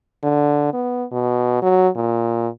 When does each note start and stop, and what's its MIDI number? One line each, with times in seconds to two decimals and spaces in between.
0.23 0.68 50
0.73 1.04 59
1.12 1.59 47
1.62 1.88 54
1.95 2.48 46